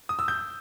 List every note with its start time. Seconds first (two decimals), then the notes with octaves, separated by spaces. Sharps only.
0.09 D#6
0.19 E6
0.28 G6